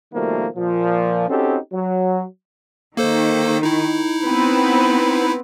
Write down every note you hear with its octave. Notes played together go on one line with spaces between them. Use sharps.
B2 D#3 F3 G3 A3 A#3
A#2 F3
C4 C#4 D#4 F#4 G4 A4
F#3
D#3 A#3 A4 C5
D#4 E4
B3 C4 B4